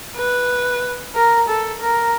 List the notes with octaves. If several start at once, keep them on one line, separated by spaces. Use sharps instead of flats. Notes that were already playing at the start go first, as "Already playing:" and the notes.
B4
A#4
A4
A#4